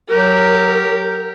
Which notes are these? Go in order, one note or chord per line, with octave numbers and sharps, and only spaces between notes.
F#3 G4 A#4